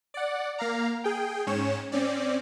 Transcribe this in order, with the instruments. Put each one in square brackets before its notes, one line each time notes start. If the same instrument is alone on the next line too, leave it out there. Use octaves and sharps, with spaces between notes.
[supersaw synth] D5 F#5
A#3 F5 A#5
G#4 G5
G#2 C#4 C#5 E7
C4 C#4 D5